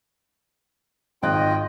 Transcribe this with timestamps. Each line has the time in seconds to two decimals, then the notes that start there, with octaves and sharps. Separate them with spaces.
1.23 G#1 F4 D#5 G5 F#6